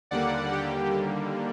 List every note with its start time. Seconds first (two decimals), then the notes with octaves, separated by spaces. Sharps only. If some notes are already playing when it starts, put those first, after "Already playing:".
0.11 D#2 D3 G3 A#3 D5 F#5
0.52 G4